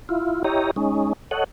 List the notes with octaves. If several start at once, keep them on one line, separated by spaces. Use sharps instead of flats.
E4 F4
E4 G4 C#5 D#5 A#5
G#3 C#4 D#4
A4 C#5 D#5 F#5